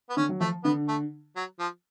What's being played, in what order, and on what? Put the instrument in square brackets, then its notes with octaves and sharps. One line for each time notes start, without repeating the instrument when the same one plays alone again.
[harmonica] B3
[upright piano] D3 [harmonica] C#4
[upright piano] F#3
[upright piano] F3 [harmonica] A3
[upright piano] D3 [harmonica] B3
[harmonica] A3
F#3
F3